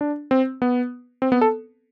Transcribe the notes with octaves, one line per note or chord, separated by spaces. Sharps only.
D4
C4
B3
C4
B3
A4